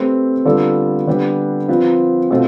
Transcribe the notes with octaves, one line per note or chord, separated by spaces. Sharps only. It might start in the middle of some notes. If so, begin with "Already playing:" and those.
Already playing: A3 C4 G4 B4
D3 G3 B3 F4 A4
D3 G3 B3 D4 G4
F3 C4 F4 B4
B2 A3 C4 F4